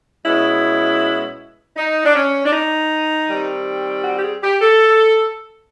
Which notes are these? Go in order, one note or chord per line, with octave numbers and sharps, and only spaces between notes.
B2 G#3 C#4 E4
D#4
D4
C#4
D4
D#4
D#3 G3 C4
F#4
G4
G#4
G4
A4